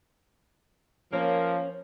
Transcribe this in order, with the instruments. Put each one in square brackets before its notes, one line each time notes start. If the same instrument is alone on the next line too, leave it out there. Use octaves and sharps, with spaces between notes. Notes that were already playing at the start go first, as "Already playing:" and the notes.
[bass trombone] F3 [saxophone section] A#3 [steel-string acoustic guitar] C#4